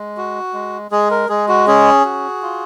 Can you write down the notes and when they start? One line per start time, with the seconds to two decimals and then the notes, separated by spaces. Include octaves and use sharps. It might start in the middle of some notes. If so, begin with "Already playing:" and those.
Already playing: G#3
0.17 F#4
0.54 G#3
0.91 G#3 G#4
1.11 A#4
1.29 G#3 G#4
1.48 F#4
1.67 C#4 G#4
2.05 F#4
2.42 F4